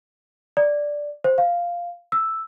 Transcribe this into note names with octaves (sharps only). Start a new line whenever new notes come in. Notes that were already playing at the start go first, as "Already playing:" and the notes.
D5
C5
F5
E6